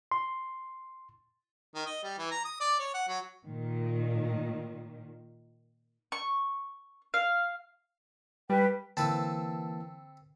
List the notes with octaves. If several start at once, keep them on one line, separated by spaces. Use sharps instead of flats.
C6
D#3
D#5
G3
E3
A#5
D#6
D5
C#5
F#5
F#3
A#2 D#3
C#6
F5
G3 B4 G5
D3 E3 A#3 C4 A4 B4 A5